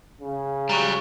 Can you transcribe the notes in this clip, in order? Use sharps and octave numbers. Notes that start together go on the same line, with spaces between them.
C#3
F#3 G3 A#5 C#6